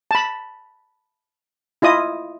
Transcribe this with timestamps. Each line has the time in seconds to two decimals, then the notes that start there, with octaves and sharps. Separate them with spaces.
0.11 A5 B5
1.82 E4 F4 D#5 D#6